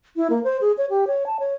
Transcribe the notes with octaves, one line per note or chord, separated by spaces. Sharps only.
E4
A#3
C5
G#4
C#5
G4
C#5
A5
C#5